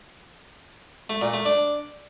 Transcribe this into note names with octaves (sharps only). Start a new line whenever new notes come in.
A3
A#2
A3
D4